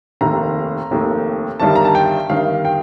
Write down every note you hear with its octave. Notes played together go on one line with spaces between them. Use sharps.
F1 D#2 D#3 A3 A#5
F1 D#2 D#3 A3
G1 G2 D#3 G3 A5
A#5
A5
G5
G1 G2 D#3 G3 F5
G5